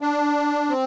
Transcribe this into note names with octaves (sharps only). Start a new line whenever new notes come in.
D4
C4